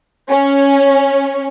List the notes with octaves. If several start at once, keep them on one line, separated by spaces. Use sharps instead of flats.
C#4